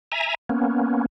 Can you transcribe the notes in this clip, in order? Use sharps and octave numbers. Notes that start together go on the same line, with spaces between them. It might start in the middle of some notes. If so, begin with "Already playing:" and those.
E5 G#5 A#5
A#3 B3 C#4